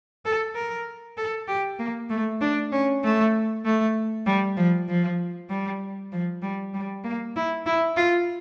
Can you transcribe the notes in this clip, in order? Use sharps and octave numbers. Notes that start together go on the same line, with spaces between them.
A4
A#4
A4
G4
A#3
A3
D4
C#4
A3
A3
G3
F3
F3
G3
F3
G3
G3
A#3
E4
E4
F4